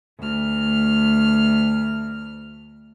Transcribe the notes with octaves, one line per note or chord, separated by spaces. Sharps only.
D2 F6